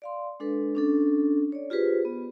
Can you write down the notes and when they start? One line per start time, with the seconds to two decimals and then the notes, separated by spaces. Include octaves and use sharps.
0.02 D5 F5 C6
0.40 G#3 D4 A4 B4
0.75 C#4 D4 A4
1.52 C#5 D5
1.70 F4 G4 G#4 B4 C5
2.05 B3